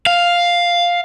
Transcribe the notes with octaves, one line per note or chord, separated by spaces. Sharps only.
F5